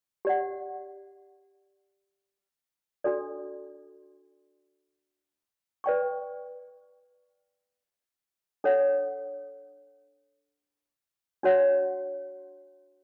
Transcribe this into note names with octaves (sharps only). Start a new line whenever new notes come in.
G4 D5 F#5
D4 F#4 A4 D5
B4 D5 G5 C#6
D4 A4 C#5 F#5
D4 F#4 C#5 F#5